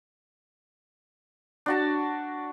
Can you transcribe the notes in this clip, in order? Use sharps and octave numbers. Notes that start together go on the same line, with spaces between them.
D4 F#4 A5